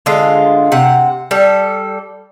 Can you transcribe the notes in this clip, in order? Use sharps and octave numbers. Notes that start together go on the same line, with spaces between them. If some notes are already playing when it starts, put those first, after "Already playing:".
D3 G#3 F4
C3 F#5
G3 A4